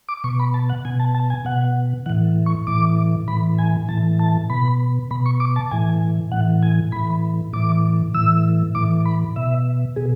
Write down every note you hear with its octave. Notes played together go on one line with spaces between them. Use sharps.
D6
B2 C#6
B5
A5
F#5
B2 G#5
A5
A5
G#5
B2 F#5
A2 E3 F#5
C#6
A2 E3 D6
A2 E3 B5
G#5
A2 E3 A5
A5
B2 B5
B2 B5
C#6
D6
A5
A2 E3 G#5
A2 E3 F#5
G#5
A2 E3 B5
A2 E3 D6
A2 E3 E6
A2 E3 D6
B5
B2 E5
B2 G#4